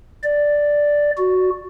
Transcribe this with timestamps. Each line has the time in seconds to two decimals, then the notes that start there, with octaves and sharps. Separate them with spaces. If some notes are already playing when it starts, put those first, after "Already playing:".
0.23 D5
1.18 F#4